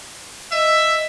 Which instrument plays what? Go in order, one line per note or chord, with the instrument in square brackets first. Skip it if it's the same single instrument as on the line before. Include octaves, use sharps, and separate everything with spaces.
[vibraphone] D#5 [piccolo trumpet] E5